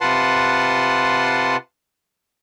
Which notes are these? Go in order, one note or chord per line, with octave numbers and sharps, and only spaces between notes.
C3 F4 B4 F#5 A5 C6